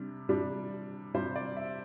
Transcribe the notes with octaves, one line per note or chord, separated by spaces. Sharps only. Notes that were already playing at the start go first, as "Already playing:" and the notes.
Already playing: C3 G3 D4
C3 G3 D4
C3 G3 D4 C5
D5
E5